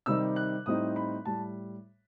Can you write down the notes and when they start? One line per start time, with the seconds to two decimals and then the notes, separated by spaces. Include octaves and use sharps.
0.06 C3 D#3 G3 D#4 E6
0.36 F#6
0.66 A2 G3 C4 D#4 D#6
0.96 B5
1.25 A2 G3 A5